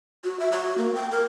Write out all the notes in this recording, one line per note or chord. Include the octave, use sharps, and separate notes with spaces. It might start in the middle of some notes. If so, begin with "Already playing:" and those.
F#4
E5
F#4
A#3
G5
A#4